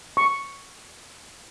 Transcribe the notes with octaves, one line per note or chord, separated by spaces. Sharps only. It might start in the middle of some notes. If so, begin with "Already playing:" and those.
C#6